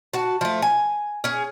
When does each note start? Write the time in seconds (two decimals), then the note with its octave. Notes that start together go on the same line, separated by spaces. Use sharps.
0.13 F#4 A5
0.41 F3 A3
0.62 G#5
1.24 C#4 G#4